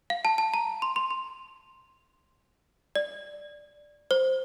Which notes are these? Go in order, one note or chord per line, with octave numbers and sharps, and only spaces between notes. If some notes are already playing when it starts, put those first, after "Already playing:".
F5
A5
A5
A#5
C6
C6
C6
D5
C5